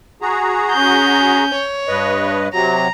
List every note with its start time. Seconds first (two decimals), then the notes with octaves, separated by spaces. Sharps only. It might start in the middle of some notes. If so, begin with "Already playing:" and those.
0.22 F#4 G#4 A#5
0.72 C#4 G6
1.55 C#5
1.88 G2 B4 D#5
2.53 C3 F#3 A#5